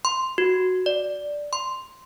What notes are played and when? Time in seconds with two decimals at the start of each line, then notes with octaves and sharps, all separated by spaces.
0.05 C6
0.38 F#4
0.86 D5
1.53 C6